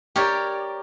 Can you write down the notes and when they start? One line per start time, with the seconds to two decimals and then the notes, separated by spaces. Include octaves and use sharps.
0.16 G4 A#4 C#5 D5